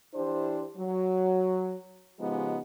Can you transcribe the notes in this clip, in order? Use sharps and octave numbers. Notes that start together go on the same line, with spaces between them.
E3 D4 E4 G4 C5
F#3
C#3 F3 G#3 B3 D#4 G4